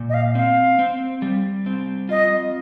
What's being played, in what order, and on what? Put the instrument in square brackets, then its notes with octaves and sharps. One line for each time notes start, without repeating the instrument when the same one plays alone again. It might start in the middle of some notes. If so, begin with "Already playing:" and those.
Already playing: [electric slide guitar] A#2
[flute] D#5
F5
[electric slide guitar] C4 [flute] F5
[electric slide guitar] C4
G3
C4
[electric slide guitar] F4 [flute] D#5